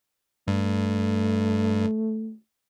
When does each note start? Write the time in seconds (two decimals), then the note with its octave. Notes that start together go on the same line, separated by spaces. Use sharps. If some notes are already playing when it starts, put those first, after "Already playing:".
0.48 G2 A3